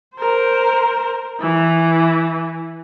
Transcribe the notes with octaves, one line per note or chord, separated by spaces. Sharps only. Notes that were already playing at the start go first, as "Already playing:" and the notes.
A#4 C5
E3